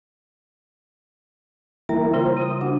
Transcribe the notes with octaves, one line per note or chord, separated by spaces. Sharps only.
E3 G3 A#3 E4 A#5
C#3 G3 F4 C5
D#6
D4 F#4